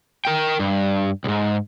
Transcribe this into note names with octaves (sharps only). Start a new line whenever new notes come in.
A#4 G5
G2
C2 G#2